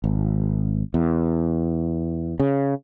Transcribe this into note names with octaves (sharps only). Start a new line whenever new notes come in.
G#1
E2
C#3